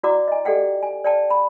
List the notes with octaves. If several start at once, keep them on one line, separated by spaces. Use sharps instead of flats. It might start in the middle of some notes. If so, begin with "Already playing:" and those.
E4 F#4 D5 F#5 A#5 D6
D#5 G#5
G4 A4 D5 F#5 G5
G#5
D5 G5 A5
B5